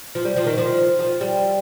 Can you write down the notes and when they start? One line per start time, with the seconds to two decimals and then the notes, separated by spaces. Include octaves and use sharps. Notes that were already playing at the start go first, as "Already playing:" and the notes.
0.15 F3
0.25 G3
0.37 F3
0.47 D#3
0.58 F3
0.99 F3
1.21 G3